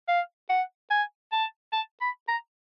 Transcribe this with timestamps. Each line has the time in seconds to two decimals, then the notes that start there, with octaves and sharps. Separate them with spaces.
0.08 F5
0.49 F#5
0.90 G#5
1.32 A5
1.73 A5
2.01 B5
2.28 A#5